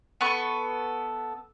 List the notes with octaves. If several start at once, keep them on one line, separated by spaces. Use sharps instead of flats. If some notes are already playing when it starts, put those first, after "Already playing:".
B3 A4 C#6